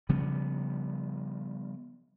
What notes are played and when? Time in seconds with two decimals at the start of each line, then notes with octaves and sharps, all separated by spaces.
0.09 C#3 F3 G3 B3